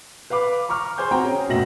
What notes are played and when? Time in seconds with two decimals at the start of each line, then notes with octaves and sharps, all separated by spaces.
0.30 B4 F5 B5 D6
0.69 A#5 C#6 D6 F6
0.98 G#4 C5 G#5 G6
1.11 C4 F#4 G5 A#5
1.24 C#4 G#4
1.48 F#1 D2 B2 E5 A#6 F#7